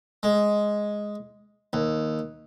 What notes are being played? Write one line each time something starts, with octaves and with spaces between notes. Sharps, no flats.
G#3
D#2